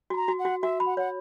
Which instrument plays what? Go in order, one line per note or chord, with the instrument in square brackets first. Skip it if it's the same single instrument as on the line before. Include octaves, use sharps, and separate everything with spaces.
[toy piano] F#4 [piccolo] B5
[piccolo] A#5
[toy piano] F#4
[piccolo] F#5
[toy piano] F#4
[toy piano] F#4 [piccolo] E5
[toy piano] B5
[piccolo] F#5
[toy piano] C#5 [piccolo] F#5